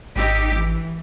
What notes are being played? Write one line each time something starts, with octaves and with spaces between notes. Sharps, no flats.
G#1 D#4 G4 E6
E3